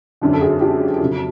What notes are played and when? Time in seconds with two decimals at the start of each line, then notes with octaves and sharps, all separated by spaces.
0.21 G#1 F#2 D3
0.33 A4
0.40 F#4 G#4
0.60 F4 G4
1.00 F2 C#3 F#3